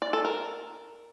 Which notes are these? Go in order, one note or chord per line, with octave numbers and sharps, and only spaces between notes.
D5
A4
A#4